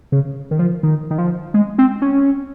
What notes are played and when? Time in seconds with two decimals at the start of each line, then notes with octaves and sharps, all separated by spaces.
0.12 C#3
0.51 D#3
0.59 F3
0.83 D#3
1.11 D#3
1.18 F3
1.54 G#3
1.78 C4
2.02 C#4